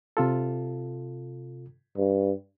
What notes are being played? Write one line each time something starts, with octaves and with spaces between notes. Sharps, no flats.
C3 F4 A4
G2